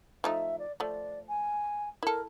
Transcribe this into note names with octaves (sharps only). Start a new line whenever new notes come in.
F3 A3 D#4 E5
D5
F3 A3 D5
G#5
E4 A4 A#4